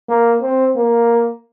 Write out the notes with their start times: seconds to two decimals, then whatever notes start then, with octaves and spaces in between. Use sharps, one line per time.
0.09 A#3
0.42 C4
0.76 A#3